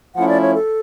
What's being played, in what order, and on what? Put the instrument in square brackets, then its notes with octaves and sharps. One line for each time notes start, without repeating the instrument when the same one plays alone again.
[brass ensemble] F3 A3 C#4 E4 [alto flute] F#5
[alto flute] D5
C#5
A4